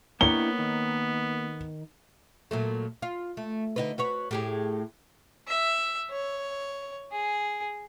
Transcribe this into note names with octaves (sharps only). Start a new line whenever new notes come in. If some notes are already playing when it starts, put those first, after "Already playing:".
A#3 B3 D4 E4 C#5 G5 G7
D#3
A#2 F#3 A3
F4
A3
D3 D#4 B4
F#4 B4 C#5
A2 G4 G#4
E5
C#5
G#4